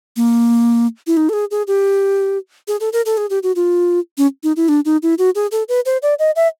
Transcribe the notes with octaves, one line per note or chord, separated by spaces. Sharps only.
A#3
E4
D#4
A4
G#4
G#4
G4
G#4
A4
A#4
A4
G#4
G4
F#4
F4
C#4
D#4
E4
D4
D#4
E4
F#4
G#4
A4
B4
C5
D5
D#5
E5